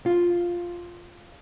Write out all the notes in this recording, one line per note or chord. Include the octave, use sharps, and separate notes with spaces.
F4